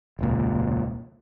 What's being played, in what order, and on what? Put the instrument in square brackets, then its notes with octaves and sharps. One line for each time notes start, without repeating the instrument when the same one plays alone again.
[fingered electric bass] E1 C#2 A#2